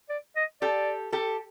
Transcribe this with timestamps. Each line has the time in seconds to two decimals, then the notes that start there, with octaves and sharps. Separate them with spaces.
0.10 D5
0.36 D#5
0.62 G4 A4 D5
1.12 G4 A4